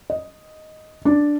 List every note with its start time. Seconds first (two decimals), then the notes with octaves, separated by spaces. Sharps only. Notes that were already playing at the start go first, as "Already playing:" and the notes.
0.10 D#5
1.05 D4